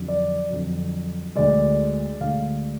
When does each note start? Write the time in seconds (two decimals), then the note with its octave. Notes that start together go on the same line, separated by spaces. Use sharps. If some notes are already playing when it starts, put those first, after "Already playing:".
Already playing: F2 D3 F#3
0.08 D5
0.50 F2 D3 F#3
1.35 D2 D3 G#3 D5
2.21 D2 D3 G#3 F5